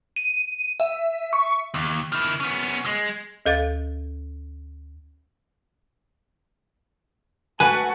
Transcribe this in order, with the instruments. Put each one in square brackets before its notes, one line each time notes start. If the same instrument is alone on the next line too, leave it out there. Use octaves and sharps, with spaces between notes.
[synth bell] D#7
E5
C#6
[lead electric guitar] D#2
D#3 E4
B3 C#4
G#3
[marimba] D2 A4 F5 A6
[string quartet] A3 F#4 A4 [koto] B4 [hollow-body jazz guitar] G#5